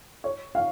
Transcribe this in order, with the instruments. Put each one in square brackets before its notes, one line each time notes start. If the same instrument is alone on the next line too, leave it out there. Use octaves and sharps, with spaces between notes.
[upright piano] C#5
F5